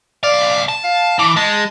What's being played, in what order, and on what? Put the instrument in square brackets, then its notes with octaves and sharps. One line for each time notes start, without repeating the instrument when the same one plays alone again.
[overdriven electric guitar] B1 F5 [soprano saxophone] D5
[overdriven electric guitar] A5
[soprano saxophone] F5
[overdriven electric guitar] E3 [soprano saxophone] D6
[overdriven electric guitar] G#3 [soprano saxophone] A5